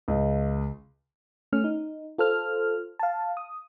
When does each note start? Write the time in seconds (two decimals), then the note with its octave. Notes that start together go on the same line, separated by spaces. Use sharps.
0.08 C#2
1.53 A3 C#4 F6
1.64 D#4
2.18 F4 A4 C5 F6
2.99 F5 A5
3.37 D#6